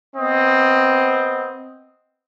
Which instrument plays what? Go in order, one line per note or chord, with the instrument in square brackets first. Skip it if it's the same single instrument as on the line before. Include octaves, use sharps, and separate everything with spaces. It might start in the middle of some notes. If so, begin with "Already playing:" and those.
[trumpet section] B3 C4 D#5 D#6